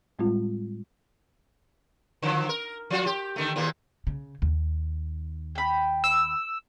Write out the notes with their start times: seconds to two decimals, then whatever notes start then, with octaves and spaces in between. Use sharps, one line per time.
0.19 A2 G3 G#3 C4 F4
2.22 D3 F3 F#3
2.49 A#4
2.90 F3 F4 F#4
3.06 G4
3.36 D3 D#3 A3
3.56 D#2 A#2 A#3
4.07 C#3
4.42 D#2
5.55 G5 B5
6.04 E6